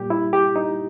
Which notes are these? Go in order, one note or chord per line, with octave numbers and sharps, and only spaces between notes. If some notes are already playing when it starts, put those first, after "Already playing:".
Already playing: A#2 G3 G4
E4
G4
D#4